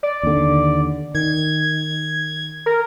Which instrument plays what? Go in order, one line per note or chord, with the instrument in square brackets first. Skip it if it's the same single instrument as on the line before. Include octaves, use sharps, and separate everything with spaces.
[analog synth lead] D5
[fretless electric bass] D#2 D3
[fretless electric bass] D#3 [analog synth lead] G#6
[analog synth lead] A#4